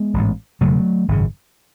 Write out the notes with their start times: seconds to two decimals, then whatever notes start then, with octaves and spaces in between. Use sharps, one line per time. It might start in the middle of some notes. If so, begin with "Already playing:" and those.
Already playing: G#3 B3
0.14 A1 G#2
0.61 E1 E2 C#3 F#3 A3
1.08 G#1 F#2 C#3